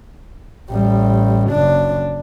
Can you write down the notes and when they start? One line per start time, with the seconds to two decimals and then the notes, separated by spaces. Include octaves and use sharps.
0.70 A1 G3
1.49 F#1 D4